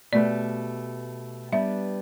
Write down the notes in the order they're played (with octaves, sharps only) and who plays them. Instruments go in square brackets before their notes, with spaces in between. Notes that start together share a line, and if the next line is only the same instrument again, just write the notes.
[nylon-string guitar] B2 A3 G4 B4 [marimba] D5
[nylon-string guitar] G3 B3 D4 G4 B4 [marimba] E5